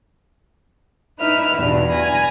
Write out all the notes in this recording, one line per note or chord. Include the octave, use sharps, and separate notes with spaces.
D#4 E4 B4 E5 F6
E2 G2 B2 G3 D4
G#5 A#5 B5